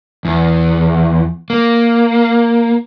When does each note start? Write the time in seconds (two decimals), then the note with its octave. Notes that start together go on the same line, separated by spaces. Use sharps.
0.25 E2
1.50 A#3